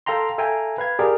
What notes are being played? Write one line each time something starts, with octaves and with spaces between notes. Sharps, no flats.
A4 F5 G5 A#5 C6
A4 E5 F5 G5 G#5 A#5
B4 F5 G#6
G4 G#4 A#4 D5